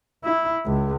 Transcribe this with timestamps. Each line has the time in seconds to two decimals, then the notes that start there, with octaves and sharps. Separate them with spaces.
0.24 E4
0.66 C#2